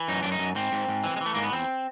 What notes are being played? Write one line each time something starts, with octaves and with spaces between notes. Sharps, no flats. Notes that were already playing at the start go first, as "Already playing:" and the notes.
Already playing: E3
F#2 D#4
F#2 D4
D#4
F#2
G#2 C4
G#2
G#2
E3
G#3
E3
A3
G#2 A#3
B3
E2 C4